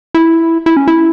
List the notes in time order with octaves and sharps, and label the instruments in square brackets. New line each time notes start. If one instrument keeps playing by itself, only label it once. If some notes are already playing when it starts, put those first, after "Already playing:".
[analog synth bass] E4
E4
C#4
E4